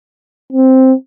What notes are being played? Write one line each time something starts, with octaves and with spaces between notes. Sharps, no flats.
C4